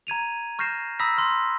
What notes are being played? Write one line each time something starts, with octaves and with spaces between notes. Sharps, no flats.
A#5 G#6 D#7 F7
C#6 F6 G6 A#6 C7 E7
A#5 B5 D#6 E6 A#6 B6
B5 C6 F6